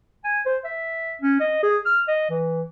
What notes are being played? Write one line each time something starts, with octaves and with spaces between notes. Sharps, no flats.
G#5
C5
E5
C#4
D#5
G#4
F6
D#5
E3